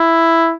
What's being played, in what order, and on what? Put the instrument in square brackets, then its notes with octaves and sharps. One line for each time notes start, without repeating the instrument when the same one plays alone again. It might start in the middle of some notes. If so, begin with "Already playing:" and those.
Already playing: [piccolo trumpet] E4